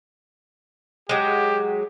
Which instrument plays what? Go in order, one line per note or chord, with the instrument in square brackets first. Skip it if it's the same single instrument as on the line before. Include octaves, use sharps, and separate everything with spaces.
[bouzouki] F#3 G#3 [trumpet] G4